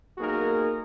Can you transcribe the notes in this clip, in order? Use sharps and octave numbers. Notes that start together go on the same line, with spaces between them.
B1 A#3 D#4 F#4 G#4 A#4